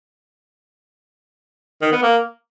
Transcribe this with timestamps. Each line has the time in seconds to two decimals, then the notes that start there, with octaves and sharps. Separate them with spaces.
1.82 D#3
1.92 B3
2.02 A#3